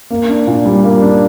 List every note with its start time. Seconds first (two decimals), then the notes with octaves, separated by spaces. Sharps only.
0.10 A#3
0.29 D4
0.47 A#2
0.66 G3
0.84 A#3
1.02 D4